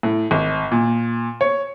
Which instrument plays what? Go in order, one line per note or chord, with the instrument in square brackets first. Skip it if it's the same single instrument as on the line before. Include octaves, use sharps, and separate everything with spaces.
[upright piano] A2
G#1
A#2
C#5